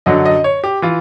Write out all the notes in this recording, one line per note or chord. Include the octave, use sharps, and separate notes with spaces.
F#2 D3 F#3 D#5
D#5
C#5
G4
E3 F4